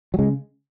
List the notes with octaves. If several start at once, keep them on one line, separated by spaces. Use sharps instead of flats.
F#3
C#3 G#3